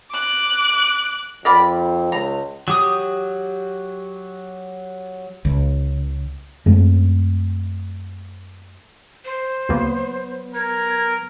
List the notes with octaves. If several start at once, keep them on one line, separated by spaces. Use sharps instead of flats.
D6 F#6
F2 A#4 D5 B5
C#2 A#5
F#3 G4 D#6
C#2
F#2 G#3 A3 C4
C5
D2 C#3 F#3 A#3 B3 B4
A#4 G#6